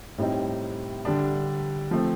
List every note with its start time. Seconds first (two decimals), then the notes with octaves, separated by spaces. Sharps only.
0.18 A2 G3 C4 D#4
1.05 D3 G3 D4
1.91 F3 A3 C4